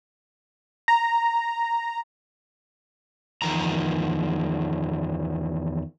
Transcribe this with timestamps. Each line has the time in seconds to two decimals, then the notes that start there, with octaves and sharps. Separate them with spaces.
0.88 A#5
3.42 E2 D#3 F3 A#5